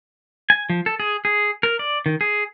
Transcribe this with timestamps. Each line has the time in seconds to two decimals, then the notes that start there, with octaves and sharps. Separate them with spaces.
0.50 G#5
0.70 F3
0.86 A4
1.00 G#4
1.25 G#4
1.63 A#4
1.79 D5
2.06 D#3
2.21 G#4